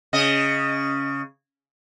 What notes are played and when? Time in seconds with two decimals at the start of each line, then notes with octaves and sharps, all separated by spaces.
0.13 C#3 D#5